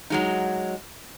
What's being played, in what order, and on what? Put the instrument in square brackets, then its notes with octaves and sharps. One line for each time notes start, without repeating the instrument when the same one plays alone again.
[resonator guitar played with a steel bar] F#3 G#3 D#4